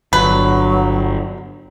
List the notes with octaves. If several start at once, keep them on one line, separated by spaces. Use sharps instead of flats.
G1 F#3 B4